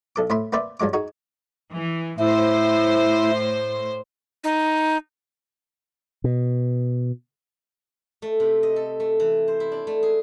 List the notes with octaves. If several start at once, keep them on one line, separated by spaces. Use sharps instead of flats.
B1 A4 D6
A2 C4 E5 B5 C6
A#3 C4 B4 C5 D5 E5
G2 F3 F#3 G#3 D6
D#4 F#4 G#4
E3
A2 E4 C5
D#4
B2
A3
C3
D#5
A4
A3
E3
C5
E4
D4
A3
G#4